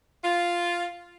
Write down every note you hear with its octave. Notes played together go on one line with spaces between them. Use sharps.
F4